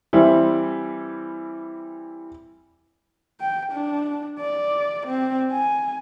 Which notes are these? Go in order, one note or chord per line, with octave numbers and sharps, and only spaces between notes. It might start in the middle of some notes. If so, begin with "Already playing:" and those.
E3 G3 C4 E4
G5
D4
D5
C4
G#5